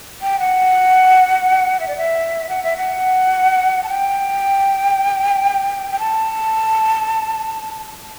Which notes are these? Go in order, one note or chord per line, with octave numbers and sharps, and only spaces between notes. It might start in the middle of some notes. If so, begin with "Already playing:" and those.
G5
F#5
E5
D5
E5
F#5
E5
F#5
A5
G5
G5
A5